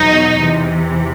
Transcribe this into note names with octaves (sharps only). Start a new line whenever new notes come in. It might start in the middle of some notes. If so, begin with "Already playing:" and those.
Already playing: E2 B2 F#3 D#4
E2 C3 E3